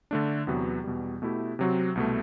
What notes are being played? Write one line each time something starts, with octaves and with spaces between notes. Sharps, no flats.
D3 A3 D4
E2 C3 F#3 B3 F#4
E2 B2 G3
B2 A3 E4 G4
C3 F#3 C4 F#4
C2 B2 A3